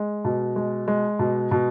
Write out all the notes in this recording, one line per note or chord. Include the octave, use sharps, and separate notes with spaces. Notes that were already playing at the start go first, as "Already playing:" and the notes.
Already playing: G#3
B2
G#3
G#3
B2
B2